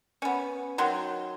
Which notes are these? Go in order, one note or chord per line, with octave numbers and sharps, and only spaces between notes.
B3 C#4
D#3 F#3 C6